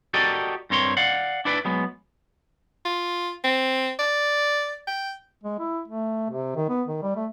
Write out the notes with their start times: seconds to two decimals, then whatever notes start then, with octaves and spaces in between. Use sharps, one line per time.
0.14 F#4 G4 A4 A#4 D5 D#5
0.70 G2 C4 A#4 C#5 C6
0.97 D5 F5 F#5
1.45 D4 E4 B4 D5
1.65 F#3 G#3 B3
2.85 F4
3.44 C4
3.99 D5
4.87 G5
5.44 G#3
5.59 E4
5.88 A3
6.30 C3
6.56 D#3
6.69 B3
6.88 D#3
7.02 G3
7.16 A3